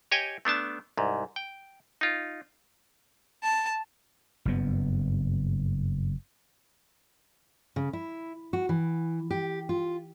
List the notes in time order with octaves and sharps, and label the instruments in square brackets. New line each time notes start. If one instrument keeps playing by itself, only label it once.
[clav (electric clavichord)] G4 C#5 D#5 G5 G#5
A3 B3 D4 A5
C2 G#2
G5
D#4 F4
[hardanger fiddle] A5
[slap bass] F#1 G2 B3
[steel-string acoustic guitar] C#3
E4
F#4
E3
G4
F4